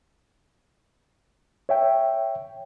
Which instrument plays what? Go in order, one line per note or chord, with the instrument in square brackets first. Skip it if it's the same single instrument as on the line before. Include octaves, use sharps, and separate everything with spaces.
[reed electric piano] C#5 E5 G5